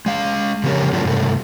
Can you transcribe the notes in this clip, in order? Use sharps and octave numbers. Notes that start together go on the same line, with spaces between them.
G#3 F5
C#3 F3 B3 G4 A#4 C#5
G#2 C#3 F#3 A3 D4 F4
G2 C3 A3